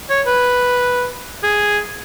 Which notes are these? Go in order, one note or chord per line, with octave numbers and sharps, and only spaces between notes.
C#5
B4
G#4